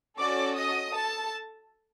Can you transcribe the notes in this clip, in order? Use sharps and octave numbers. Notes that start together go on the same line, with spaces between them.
C#4 F#4 A4 D5 D6
D#5 D#6
A4 A5